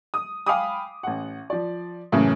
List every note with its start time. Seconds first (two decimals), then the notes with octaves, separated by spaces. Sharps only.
0.14 D#6
0.46 F5 G5 G#5 B5 D6 D#6
1.03 A1 F#5
1.50 F3 D5
2.12 F#2 A2 C#3 E3